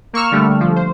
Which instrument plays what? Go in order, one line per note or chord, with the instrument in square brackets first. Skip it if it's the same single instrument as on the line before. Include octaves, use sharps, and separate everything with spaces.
[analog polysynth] A#3 C#6 E6 F6
D3 G3 A3
F3
C5